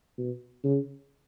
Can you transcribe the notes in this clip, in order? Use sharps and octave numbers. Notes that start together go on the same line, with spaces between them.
B2
C#3